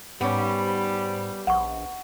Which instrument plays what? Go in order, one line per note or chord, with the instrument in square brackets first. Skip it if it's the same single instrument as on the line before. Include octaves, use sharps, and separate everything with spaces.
[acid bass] G#2 [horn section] G3 [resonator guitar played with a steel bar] B3 C#4
[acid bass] A#1 [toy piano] F#5 C#6